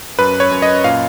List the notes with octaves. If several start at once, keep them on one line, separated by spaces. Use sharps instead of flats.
F#2 B4
C#5
F#2
D#5
A#2 F5